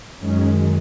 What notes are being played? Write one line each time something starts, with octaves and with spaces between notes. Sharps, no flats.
F#2 D#3 G#3 C#4